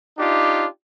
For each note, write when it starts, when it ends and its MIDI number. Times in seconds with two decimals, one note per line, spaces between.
0.18 0.66 62
0.18 0.66 63
0.18 0.66 65
0.18 0.66 67